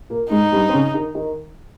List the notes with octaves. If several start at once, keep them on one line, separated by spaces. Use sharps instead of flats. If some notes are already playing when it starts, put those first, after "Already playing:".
A#2 A#3
G#2 G#3 D#4
G2 G3
C4
C#3 C#4
D#3 D#4
D#3 D#4